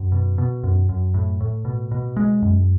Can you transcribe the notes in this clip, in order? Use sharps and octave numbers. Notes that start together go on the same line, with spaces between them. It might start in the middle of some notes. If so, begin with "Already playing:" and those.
Already playing: F#2
B2
B2
F#2
F#2
A2
A2
B2
B2
G#3
F#2